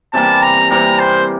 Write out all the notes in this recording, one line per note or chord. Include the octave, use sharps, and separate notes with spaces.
C3 E3 G3 A#3 A5
A#5
C3 E3 G3 A#3 A#5
C5